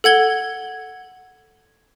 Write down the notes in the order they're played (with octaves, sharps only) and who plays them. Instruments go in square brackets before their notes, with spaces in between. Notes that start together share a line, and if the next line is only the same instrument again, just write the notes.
[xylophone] A4 F#5 G#6 G7